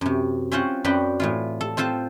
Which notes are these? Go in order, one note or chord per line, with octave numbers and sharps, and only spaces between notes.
F#2 C3
C4 C#4 F4 C5 F#5
F#2 C4 B4 D5 F#5 G5
A2 E3 F4
A4
C4 F4 A4 C5 A5